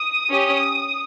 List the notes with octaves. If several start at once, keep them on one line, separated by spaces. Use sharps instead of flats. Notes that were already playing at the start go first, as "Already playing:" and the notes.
Already playing: D#6
C#4 G4